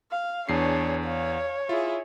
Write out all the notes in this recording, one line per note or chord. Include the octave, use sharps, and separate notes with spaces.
F5
E2 D4 G#4 C#5 C7
C#5 F5
E4 F4 G#4